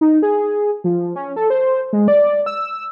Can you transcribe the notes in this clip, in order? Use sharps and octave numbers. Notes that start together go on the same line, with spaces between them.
D#4
G#4
F3
C#4
A4
C5
G#3
D5
E6